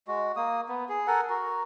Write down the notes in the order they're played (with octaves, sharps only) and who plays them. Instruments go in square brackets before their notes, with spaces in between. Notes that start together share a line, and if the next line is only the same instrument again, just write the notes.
[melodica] G#3 F#4
A#3 D#6
B3
G#4
A4 A#4 F#5 G#5
F#4 A#4